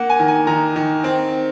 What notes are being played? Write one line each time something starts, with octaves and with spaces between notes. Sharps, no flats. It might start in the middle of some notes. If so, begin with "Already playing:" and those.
Already playing: A#3 F#5
G#5
D#3
G#5
D#3 A#5
D#3
C4